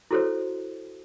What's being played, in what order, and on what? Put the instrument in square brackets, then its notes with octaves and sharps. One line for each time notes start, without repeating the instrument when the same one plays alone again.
[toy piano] E4 F#4 A4 C5 C#5